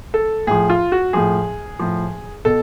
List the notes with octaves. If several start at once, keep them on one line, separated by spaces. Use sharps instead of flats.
A4
A2 F3 G#4
F4
F#4
A2 F3 G#4
A2 F3
B2 A4